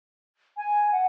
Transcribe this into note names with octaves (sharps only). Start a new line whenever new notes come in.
G#5
F#5